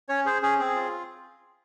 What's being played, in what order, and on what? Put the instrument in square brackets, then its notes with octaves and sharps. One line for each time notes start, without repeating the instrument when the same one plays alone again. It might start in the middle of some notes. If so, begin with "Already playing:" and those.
[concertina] C#4 C#5
G#4 C5
C#4 G#4
C4 G#4
F4